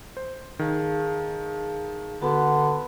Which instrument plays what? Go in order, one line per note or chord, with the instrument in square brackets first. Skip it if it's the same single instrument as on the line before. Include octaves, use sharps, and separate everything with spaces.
[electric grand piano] C5
[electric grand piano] D#3 [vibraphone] G#4 F5 A5
[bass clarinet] D3 [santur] B3 B4 [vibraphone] F#4